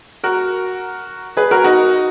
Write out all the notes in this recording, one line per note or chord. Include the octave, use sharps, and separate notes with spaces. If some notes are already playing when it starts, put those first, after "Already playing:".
F#4 A#4
G#4 B4
F#4 A#4
D#4 F#4